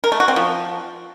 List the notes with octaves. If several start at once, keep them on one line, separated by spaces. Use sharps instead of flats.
A#4
A3
F#4
C4
F3